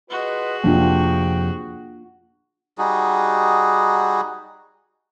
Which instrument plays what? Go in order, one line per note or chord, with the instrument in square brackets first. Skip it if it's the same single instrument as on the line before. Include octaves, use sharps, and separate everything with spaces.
[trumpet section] F4 B4 D#5 [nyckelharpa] F#4 G#4
[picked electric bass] F2 C3 F3 [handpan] A#3 D4 F4 [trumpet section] G5
[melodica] G3 D#4 F#4 G#4